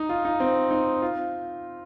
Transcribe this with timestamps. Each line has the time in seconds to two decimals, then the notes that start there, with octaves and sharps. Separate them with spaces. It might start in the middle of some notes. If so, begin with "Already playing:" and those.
Already playing: D#4
0.09 F4
0.25 D#4
0.40 C4
0.71 D#4
1.02 F4